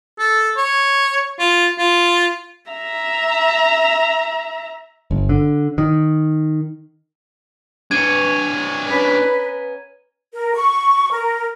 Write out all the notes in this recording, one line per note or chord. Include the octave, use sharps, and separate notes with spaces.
A4
C#5
F4
F4
E5 A#5
G1
D3
D#3
B3 D4 C#5 G#6 D#7
B3 C#4 A#4 B4
A#4
C#6
A#4